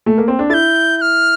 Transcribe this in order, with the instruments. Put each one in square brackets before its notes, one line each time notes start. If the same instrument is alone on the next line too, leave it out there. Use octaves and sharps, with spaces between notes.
[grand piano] A3
A#3
C4
D4
[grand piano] E4 [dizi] A6
[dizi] G6
G6
F6